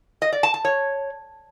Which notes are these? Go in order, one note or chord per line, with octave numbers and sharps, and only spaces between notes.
D#5
D5
A5
A5
C#5